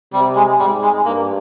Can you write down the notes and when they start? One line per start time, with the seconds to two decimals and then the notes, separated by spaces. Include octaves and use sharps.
0.13 C3 G3
0.36 G#3
0.59 G#2 G3
0.82 G#3
1.05 G2 A#3